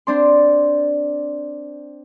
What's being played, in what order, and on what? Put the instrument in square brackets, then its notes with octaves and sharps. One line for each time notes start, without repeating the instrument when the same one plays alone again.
[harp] C4 D4 C6